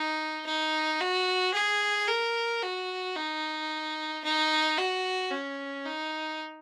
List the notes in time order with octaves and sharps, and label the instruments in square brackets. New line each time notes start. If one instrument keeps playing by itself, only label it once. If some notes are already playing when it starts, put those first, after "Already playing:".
Already playing: [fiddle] D#4
D#4
F#4
G#4
A#4
F#4
D#4
D#4
F#4
C#4
D#4